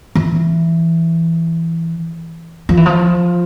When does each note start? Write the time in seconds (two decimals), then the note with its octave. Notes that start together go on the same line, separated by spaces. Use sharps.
0.15 E3
2.69 F3
2.77 E3
2.86 F3